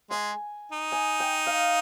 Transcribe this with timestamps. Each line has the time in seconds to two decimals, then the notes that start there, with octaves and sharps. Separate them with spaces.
0.10 G#3 G#5
0.72 D#4
0.92 G#5
1.20 G5
1.47 F5